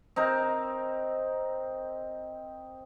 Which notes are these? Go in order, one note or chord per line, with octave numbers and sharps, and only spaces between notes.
C4 D#4 A#4